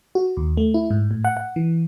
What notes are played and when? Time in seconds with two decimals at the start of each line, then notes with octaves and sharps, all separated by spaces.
0.15 F#4
0.37 D#2
0.57 A3
0.74 E4
0.91 G#2
1.11 A2
1.25 F#5
1.37 F#5
1.56 E3